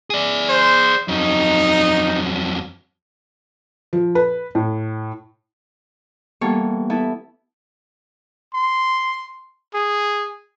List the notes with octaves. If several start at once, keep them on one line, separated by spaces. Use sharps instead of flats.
G#4 D5
C5
F2 F#3 D#4
F3
B4
A2
E3 G3 A#3 B3 A4 C#5
B3 E4 A4 E5
C6
G#4